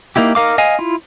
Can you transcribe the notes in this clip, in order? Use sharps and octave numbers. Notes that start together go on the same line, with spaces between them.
A#3 D#4 E4 G4
D#4 A#4 F5 D6
D#5 F5 G#5
E4 F4